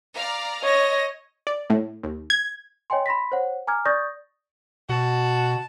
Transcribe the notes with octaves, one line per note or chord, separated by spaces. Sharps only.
D5 F5 A#5
C#5 D#5 A#6
D5
A2
D#2
G#6
C#5 D#5 G5 G#5 C6
B5 C6 A#6 B6
C5 C#5 F#5
G#5 A#5 D6 F6 G#6
D5 C#6 D#6 G6 A6 A#6
B2 F#4 A5